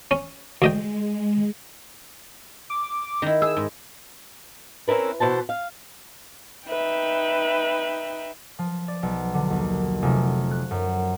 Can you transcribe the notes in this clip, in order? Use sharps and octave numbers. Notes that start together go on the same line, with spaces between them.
C#4
D2 G#3 D#5 G5
D6
D#3 E4
G#4 E6
G#2
C4 C#4 E4 A#4 B4
B2 E3 C5 A5
F5
D#4 B4 E5 G5
F3
D5
B1
D3
D#2
F1
F#6
F#2